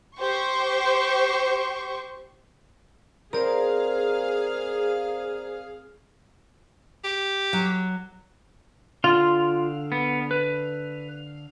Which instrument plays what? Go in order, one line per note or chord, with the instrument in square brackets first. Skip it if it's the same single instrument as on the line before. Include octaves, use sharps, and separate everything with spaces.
[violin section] G4 C5 C#6
[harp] C4 A#4 [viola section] G#4 F5 [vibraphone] C5 D5 A#5
[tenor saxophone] G4
[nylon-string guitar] F#3
[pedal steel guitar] D3 F5 [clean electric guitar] F4 C6
[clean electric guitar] B3
B4